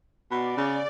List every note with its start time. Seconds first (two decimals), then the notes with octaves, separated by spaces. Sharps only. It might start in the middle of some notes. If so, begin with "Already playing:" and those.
0.31 B2 D5
0.57 C#3